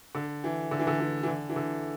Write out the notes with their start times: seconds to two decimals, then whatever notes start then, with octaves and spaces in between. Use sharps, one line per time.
0.15 D3
0.44 E3
0.71 D3
0.79 E3
0.87 D3
1.00 E3
1.23 E3
1.28 D3
1.49 E3
1.56 D3